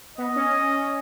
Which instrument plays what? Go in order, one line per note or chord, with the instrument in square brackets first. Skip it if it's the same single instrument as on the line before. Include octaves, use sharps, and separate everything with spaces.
[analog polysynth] B3 [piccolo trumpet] D#5
[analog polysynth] C#4